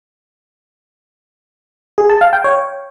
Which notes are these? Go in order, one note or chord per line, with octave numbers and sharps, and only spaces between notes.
G#4
A5
F5
G5
C#5